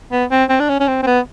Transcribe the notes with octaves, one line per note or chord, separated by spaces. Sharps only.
B3
C4
C4
D4
C#4
C#4
C4
C4
B3